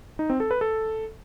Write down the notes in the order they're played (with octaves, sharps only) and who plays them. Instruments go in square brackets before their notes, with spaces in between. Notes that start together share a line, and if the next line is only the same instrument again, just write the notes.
[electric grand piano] D#4
C4
A4
B4
A4